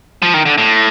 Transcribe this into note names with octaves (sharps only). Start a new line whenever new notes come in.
F3
D#3
D3
A2